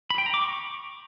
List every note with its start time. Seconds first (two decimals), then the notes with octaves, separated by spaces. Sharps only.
0.10 B5
0.18 G5
0.26 A#5
0.34 D6
0.42 C#6